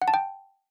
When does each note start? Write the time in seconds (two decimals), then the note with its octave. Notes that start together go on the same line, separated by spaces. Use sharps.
0.02 F#5
0.08 A5
0.14 G5